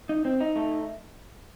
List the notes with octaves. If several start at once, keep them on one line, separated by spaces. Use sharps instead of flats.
D#4
C4
D#4
A3